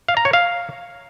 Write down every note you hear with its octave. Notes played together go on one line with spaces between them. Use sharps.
F5
A#5
C#5
F5